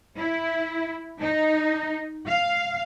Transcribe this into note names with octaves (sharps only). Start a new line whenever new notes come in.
E4
D#4
F5